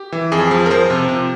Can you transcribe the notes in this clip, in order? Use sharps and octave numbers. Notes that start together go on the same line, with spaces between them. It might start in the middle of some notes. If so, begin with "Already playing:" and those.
Already playing: G4
E3
F2 G#4
F3
A#4
F3 C5
C3
C3